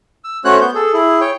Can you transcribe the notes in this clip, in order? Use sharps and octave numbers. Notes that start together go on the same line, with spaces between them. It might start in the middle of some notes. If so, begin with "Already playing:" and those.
E6
A3 C#4 F#4 C5 C#5 F#6
B3 G6
G#4 A4
E4 G#4
C#5 G5